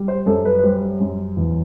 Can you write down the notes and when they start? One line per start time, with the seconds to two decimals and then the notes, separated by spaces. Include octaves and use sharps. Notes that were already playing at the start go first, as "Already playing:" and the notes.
Already playing: G3
0.08 C5
0.26 F#2 A4
0.45 B4
0.59 B4
0.64 G3 C5
1.00 F#2
1.37 E2